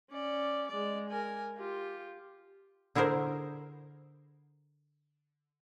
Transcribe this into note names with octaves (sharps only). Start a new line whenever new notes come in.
C#4 D5
G#3 D5
A#4 G#5
F4 G4
D3 E4 G#4 A#4 C5